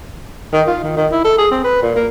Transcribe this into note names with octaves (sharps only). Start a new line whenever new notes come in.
D#3
F4
D#3
D#3
E4
A4
G#4
C4
B4
A#2
A#3